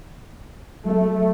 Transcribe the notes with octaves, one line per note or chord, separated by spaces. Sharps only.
F#3 A3